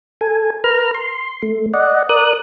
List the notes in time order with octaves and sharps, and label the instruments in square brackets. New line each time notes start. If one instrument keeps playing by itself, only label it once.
[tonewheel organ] A4 G#5
A#4 B4 A#5 F6
C6
A3
D5 D#5 F#5
A#4 D5 D#6 F#6